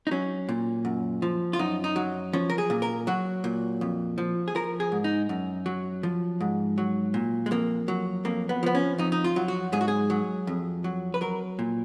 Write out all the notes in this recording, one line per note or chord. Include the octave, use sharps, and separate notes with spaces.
D#4
F#3 C#4
A#2
F#2
F3
F4
F#2 D#4
D#4
F#3
F3 C#4
A#4
G#4
A#2
A#4
F#3 F#4
A#2
F2
F3
G#4
F3 A#4
G#4
G#2
D#4
F#2
F#3
F3
G#2
F#3
A#2
G#3
F2 A#3
F#3
F2 A#3
B3
F3 B3
C#4
F2 D#4
D#4
F4
F#3
F#4
G#2 G#4
F#4
G#4
F#3
F2
F#3
B4
F#3 A#4
A#2